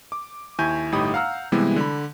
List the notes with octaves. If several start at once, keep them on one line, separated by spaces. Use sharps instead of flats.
D6
D#2 E4 G#5 C#6 G6
G1 A2 D#4 G4 B5 D#6
F5 F#5 A#5 E6 F6
C3 E3 G3 G#3 B3 E4
D3 B5